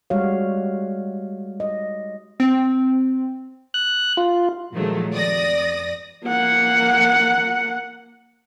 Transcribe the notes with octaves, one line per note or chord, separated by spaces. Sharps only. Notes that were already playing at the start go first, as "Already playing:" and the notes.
G3 G#3 F#4 C#5 F5
D#5
C4
F#6
F4
A#2 D#3 F3 F#3 G#3 A3
F2 D5 D#6 A#6
A#3 F#5